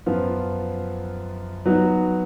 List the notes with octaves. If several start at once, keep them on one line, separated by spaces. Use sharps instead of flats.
F#2 F3 B3 F4
F#3 B3 D#4 F#4